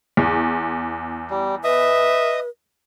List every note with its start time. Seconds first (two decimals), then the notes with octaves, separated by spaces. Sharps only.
0.17 E2
1.30 G3
1.64 B4 D#5 E5 D#6